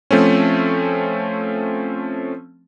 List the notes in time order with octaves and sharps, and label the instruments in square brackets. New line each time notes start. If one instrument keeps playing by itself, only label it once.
[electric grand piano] F3 A3 C4 C#4